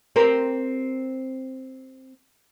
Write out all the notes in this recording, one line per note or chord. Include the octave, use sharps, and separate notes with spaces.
C4 G4 A#4